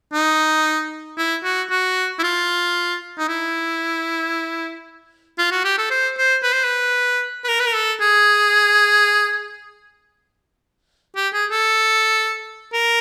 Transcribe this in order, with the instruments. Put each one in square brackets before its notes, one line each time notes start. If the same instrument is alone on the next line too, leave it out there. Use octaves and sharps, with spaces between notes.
[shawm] D#4
E4
F#4
F#4
E4
F4
D#4
E4
F4
F#4
G4
A4
C5
C5
B4
C5
B4
B4
A#4
B4
A#4
A4
G#4
G4
G#4
A4
A#4